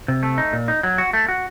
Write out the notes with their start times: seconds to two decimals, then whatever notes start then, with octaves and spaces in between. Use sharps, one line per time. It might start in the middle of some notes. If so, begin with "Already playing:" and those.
0.08 C3
0.23 A3
0.38 D#4
0.53 A#2
0.68 D#4
0.83 F#3
0.98 F#4
1.13 A3
1.28 F#4